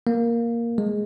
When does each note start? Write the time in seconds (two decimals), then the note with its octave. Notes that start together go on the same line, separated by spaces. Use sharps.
0.07 A#3
0.78 G#3